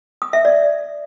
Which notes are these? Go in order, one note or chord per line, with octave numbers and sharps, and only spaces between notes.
D#6
E5
D5